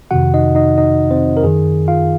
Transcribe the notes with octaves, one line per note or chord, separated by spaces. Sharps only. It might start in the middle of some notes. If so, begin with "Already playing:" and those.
F2 C3 D#3 F#4 F#5
D#4 D#5
D#4 D#5
D#4 D#5
C4 C5
A#4
F#2 D#3 G#4
F4 F5